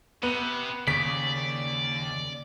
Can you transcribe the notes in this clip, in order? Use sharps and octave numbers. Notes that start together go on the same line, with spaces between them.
C3 B3
D#2 C#3 D5 B6